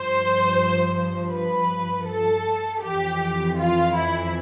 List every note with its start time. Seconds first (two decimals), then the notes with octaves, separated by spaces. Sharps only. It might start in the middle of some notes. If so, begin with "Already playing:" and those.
Already playing: G2 F3 C5
1.32 B4
2.07 A4
2.82 F2 E3 G4
3.58 F4
3.95 E4